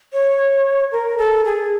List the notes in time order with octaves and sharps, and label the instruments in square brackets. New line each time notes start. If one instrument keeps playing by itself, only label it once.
[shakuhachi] C#5
A#4
A4
G#4